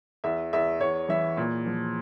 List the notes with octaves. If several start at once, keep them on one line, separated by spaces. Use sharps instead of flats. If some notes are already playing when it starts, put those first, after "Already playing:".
E2 E5
E2 E5
E2 C#5
E3 E5
A#2
F3